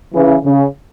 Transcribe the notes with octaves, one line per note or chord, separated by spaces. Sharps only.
C#3 E3
C#3